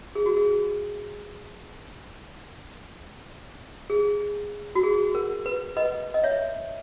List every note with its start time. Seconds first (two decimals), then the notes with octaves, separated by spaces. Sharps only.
0.15 G#4
0.26 F#4
0.37 G#4
3.90 G#4
4.75 F#4
4.83 G#4
5.15 A#4
5.46 B4
5.77 B4 D#5
6.14 D#5
6.24 C#5 E5